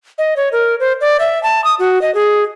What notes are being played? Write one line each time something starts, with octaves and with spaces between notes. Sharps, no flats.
D#5
C#5
A#4
C5
D5
E5
A5
D#6
F#4
D#5
G#4